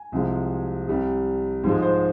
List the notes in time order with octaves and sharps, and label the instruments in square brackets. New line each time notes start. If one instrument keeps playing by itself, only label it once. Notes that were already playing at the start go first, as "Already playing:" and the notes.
Already playing: [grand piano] G#5
C2 C3 F3 G#3
C2 C3 G3
G#2 F3 G#3
C5